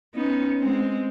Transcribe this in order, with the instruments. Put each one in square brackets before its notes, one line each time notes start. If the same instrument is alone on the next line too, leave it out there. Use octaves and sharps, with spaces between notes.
[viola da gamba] B3 C#4 D#4
G#3 C4